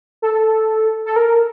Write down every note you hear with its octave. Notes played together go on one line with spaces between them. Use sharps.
A4
A4
A#4